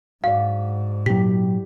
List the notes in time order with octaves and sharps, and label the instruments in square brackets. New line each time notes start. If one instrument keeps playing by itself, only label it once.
[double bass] G#2 [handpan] F#4 D5 [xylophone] F5
[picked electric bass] A#2 F#3 [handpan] E4 G4 [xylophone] B6